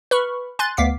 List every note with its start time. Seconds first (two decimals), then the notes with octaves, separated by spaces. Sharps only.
0.11 B4 B5 C#6 F6
0.59 G#5 C6 F#6 A6
0.77 D2 B3 F5 D6 B6 C7